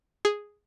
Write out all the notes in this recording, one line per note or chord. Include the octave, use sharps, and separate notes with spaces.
G#4